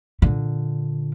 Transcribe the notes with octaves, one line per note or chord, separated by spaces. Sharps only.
A#2 D3